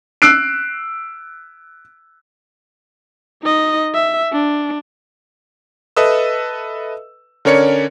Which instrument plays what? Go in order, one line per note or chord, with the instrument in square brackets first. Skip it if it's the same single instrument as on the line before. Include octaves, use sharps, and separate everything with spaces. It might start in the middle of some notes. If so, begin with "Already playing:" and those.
[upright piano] E6 F#6 C7 D7
[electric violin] D#4 D#5
E5
D4
[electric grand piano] A4 B4 D#5 E5 D#6 E6
D3 C#4 A#4 C#5 D5 C#7